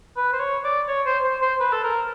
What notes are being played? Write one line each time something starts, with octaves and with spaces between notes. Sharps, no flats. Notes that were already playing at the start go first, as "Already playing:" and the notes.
B4
C5
C#5
D5
C#5
C5
C5
C5
B4
A4
A#4